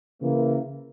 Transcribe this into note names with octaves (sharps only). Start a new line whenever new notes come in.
C#3 E3 A#3